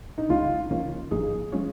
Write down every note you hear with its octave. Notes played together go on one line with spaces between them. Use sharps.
D#4
C#2 C#3 G#3 C#4 F4
C#2 C#3 F3 A#3 C#4
G#1 G#2 F3 A#3 D#4 G#4
F3 G#3 C#4 F4 C#5